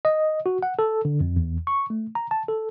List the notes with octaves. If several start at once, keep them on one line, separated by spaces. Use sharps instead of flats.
D#5
F#4
F#5
A4
D3
F2
E2
C#6
A3
A#5
A5
A4